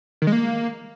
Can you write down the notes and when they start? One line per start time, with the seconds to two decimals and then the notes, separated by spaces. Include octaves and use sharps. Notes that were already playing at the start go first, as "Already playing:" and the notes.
0.22 D#3
0.27 G#3
0.32 A#3